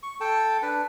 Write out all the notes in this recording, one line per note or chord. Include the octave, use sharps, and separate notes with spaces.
C#6
A4 G5 A5
D4 B4